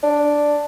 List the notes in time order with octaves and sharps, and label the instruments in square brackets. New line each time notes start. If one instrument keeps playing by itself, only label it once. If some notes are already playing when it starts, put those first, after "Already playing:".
[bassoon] D4